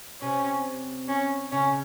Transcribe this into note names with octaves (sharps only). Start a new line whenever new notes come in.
C3 C#4
C#4
C#3 C#4